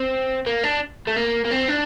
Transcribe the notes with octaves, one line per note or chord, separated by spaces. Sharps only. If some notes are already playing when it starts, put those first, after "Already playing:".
Already playing: C4
A#3
D4
A3
A#3
A#3
C4
D4